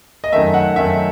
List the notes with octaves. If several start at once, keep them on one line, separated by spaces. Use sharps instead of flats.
D#5
F#2 D#3 A3 E5
F#5
F#2 D#3 A3 E5